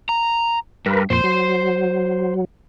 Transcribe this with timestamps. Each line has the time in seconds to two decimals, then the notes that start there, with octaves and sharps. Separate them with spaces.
0.09 A#5
0.86 G2 A#4 B4
1.10 F2 A#2 C5 C6
1.24 F#3